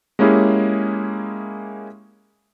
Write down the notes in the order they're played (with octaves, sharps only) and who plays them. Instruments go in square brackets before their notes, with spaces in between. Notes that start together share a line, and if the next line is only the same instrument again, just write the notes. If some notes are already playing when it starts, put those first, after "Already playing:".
[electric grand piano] G#3 A#3 C#4 E4 G4 G#4